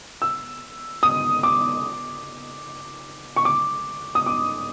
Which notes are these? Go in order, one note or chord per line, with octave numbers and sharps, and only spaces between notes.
E6
D#6
D6
C#6
D6
D#6
D6